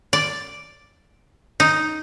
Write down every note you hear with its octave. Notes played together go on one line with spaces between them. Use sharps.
D5
D#4